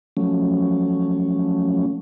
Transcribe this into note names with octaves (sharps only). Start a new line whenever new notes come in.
F3 F#3 A3 C#4